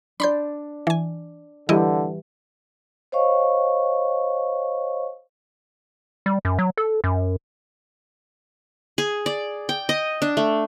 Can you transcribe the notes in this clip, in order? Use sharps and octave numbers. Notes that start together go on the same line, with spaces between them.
D4 D5 B5 C6 G6
E3 G#5
D3 E3 G3 E4 G4 D#5
C5 C#5 D#5 F5 C#6
G3
F#2
F#3
A4
F#2
G#4
D5
G5
D#5
D4
A3